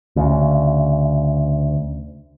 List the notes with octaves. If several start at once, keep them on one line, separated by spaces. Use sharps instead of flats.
D2 C#3